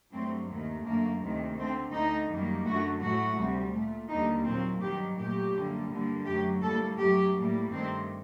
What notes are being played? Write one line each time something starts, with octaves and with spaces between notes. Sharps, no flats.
G2 F#3 A3 C4
D#2 D#3 A3
F#2 D3 A3 A#3
D2 C3 D#3 A3
D2 D3 A3 C4
D2 D3 A3 D#4
F#2 D#3 G3 A#3
F#2 D3 A3 F#4
A2 F#3 A3 F#4
D2 C3 G3
A#2 A3
D#2 D3 G3 A#3 D#4
A#2 F#3 A#3 C4
G2 D#3 F#3 G4
A#2 F#3 A3 G4
F#2 D3 G3 A#3
G2 D3 G3 A#3
F#2 F#3 A3 G4
A2 G3 A#3 A4
F#2 F#3 A3 G4
A2 G3 A#3
G2 D#3 A3 C4